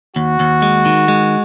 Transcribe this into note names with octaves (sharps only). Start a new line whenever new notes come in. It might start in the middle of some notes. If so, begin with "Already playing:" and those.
D#2 F#4
D#2
G#3
D#3
G#3